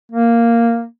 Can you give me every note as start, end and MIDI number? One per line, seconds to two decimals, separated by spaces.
0.11 0.85 58